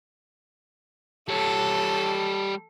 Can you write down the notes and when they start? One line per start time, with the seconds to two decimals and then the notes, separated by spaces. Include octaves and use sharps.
1.29 G3 A4 C#5